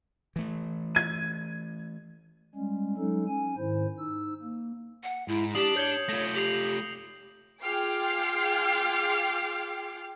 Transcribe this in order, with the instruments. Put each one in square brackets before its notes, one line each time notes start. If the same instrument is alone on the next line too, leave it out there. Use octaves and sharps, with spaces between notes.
[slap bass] E3 A3
[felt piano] G#6 D#7
[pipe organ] G3 G#3 C#4
F#3 G#3 C#4 D#4 A4
C#4 G#5
G#2 D#3 E4 C5
D#4 E6
A#3
[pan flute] F#5
[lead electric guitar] G#2 [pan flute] E4
[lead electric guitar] D4 [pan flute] G4 [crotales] D#6 C7 F#7
[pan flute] C#5 [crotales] G6 C#7 G7
[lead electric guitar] A3 F4 [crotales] A#6
[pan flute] G4 [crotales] C7 F7 F#7
[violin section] F4 G#4 G5 D6 F6 C7